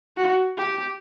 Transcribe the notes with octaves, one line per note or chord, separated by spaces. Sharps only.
F#4
G4